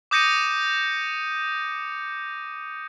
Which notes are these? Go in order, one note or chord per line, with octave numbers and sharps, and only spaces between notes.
D6 D#6 G6 A#6 C#7 D#7